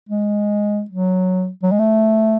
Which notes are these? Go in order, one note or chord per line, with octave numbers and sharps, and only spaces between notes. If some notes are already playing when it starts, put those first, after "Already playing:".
G#3
F#3
F#3
G#3
A3